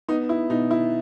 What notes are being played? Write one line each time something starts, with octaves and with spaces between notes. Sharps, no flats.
B3 D#4
E4
B2 D#4
E4